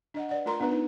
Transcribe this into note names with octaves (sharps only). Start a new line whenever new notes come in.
D4 D#5 F#5
B4 D5 F#5
A3 F4 A#4 A#5 C6
B3 D4 F4 B4
D#4